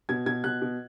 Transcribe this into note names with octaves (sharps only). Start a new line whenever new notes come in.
B2 G#6
B2 G#6
B2 F#6
B2